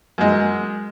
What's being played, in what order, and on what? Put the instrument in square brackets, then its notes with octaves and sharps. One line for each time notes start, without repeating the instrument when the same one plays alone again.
[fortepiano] F#2 G#3